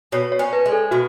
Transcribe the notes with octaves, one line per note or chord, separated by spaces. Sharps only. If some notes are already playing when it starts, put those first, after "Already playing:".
B2 C#5
C#5
C#4
B4
G#3
A4
B2 F#4